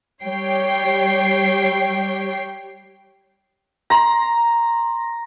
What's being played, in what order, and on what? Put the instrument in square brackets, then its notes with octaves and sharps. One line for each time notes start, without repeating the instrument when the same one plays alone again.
[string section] G3 G4 C#5 G5 C7
[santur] A#5 C6